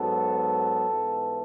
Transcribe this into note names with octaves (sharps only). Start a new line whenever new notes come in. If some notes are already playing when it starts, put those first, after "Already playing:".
Already playing: G#2 F#3 B3 A4
G#2 E3 B3